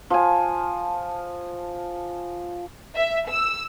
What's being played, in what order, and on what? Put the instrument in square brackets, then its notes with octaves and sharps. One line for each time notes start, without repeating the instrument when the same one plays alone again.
[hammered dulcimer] F3 G#5
[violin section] E5
E6